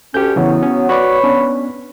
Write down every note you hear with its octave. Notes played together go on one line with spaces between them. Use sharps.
D2 C#4 G4 G6
C#3 E3 F#3 B3 C#4
C#4
F#4 B4 C#5 D5 B5
B3 C#4 D4